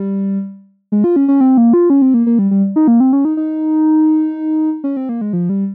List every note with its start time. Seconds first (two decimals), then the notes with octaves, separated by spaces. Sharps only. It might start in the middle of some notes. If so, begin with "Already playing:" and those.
Already playing: G3
0.92 G#3
1.04 F4
1.16 C#4
1.28 C#4
1.41 C4
1.58 A#3
1.74 F4
1.90 C#4
2.02 C4
2.14 A#3
2.27 A#3
2.39 G3
2.51 G3
2.76 D#4
2.88 A#3
3.00 C4
3.13 C#4
3.25 D#4
3.37 D#4
4.84 C#4
4.97 C4
5.09 A#3
5.21 G#3
5.33 F3
5.49 G3